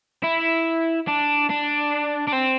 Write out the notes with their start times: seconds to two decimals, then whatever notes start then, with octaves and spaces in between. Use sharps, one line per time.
0.24 E4
1.08 D4
1.50 D4
2.28 D4
2.33 C4